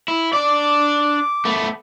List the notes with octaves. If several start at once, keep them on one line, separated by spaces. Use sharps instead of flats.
E4
D4 D5 D6
A3 B3